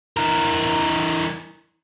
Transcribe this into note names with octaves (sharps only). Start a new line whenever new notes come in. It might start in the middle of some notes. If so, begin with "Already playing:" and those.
E3 A#4